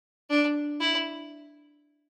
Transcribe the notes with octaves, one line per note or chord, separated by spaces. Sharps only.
D4
E4